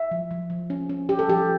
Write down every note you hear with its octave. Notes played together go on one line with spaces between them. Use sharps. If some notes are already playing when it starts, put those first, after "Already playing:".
Already playing: E5
F3
F3
F3
C#4
C#4
C#4 G4
A4
F3 G4